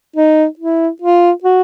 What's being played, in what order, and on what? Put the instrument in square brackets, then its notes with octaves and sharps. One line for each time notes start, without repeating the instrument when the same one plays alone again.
[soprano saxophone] D#4
E4
F4
F#4